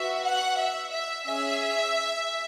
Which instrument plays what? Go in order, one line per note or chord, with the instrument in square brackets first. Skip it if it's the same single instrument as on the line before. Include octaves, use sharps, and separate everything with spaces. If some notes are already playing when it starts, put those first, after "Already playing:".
Already playing: [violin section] B3 F#4 E5
F#5
E5
E5
C#4 G#4 E5